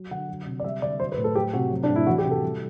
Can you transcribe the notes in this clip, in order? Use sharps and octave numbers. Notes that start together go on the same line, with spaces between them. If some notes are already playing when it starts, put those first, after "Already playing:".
Already playing: F#3
D3 F#5
F#3
C3
D5
G3 E5
D3 D5
F#3 C5
B4
A2
A4
F#3 G4
C3 F#4
F#3
D4
A2
E4
E3 F#4
G4
C3
A4
G3